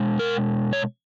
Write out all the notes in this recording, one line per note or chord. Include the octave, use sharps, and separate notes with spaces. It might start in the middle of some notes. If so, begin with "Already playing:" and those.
Already playing: B2 G#3
A#4
C#5